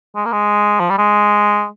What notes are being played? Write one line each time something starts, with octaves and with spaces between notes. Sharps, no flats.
G#3
A#3
G#3
F3
G3
G#3